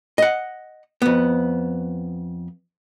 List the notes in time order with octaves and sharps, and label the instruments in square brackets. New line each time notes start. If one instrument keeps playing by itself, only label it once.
[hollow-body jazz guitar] D#5 F#5
F2 B3